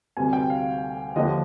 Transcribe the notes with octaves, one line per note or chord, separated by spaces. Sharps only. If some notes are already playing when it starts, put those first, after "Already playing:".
D2 C3 G3 G#5
G5
F5
D#2 D3 F3 D#5